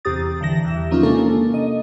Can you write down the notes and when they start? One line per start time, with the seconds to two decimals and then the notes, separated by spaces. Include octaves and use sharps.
0.05 E2 C3 G4 A#5 D#6 A6
0.40 G1 D3 E3 A#6
0.65 E2 G4 E5
0.91 F3 A#3 C#4 D#4 F4
1.03 C3 G#3 A#3 D4 A4
1.54 D#5